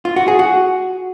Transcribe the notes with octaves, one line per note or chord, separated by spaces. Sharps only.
F4
F#4
G#4
F#4